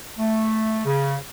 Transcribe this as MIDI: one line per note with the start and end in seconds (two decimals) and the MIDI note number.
0.19 0.81 57
0.85 1.16 49